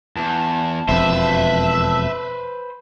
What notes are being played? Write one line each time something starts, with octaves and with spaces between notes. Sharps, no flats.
E2 A5
E1 F2 B4 C5 E5